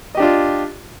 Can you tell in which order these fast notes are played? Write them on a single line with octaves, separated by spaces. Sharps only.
D#5 G4 D4 F4